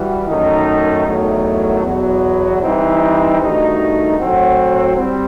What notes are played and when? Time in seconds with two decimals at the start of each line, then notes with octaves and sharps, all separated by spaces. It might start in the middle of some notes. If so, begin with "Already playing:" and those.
Already playing: E3 G3 F#4
0.27 F#2 D#3 A3 D#4
1.05 E2 D#3 F#3 A3
1.83 E2 B2 F#3 B3 F#4
2.61 E3 G3 C4 D#4
3.40 G2 D#3 A3 D#4 F#4
4.18 A2 F#3 C4 F#4
4.96 G3 C4